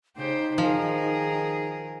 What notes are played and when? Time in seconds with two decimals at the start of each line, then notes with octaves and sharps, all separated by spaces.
0.16 C#3 D#4 G4 C5
0.58 D#3 F3 G#4 A#4